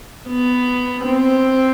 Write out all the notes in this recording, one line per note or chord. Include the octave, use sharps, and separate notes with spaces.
B3
C4